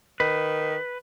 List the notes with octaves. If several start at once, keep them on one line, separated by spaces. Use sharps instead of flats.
D#3 B4